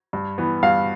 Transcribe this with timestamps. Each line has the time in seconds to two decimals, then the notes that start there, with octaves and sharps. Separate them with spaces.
0.13 G2
0.38 E3 B3
0.63 G2 F5